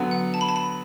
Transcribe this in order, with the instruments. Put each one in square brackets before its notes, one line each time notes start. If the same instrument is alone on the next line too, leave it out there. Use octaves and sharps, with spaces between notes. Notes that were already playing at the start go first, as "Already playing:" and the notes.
Already playing: [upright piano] D3 F#3 B3
[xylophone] F#5
A5
B5
A5
B5